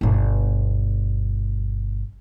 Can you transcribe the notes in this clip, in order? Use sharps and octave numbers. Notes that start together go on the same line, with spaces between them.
G1 B2